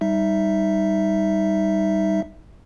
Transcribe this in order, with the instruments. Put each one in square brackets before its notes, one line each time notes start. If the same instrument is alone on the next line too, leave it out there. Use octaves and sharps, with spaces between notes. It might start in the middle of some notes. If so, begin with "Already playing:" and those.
[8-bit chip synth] G3 D#4 E5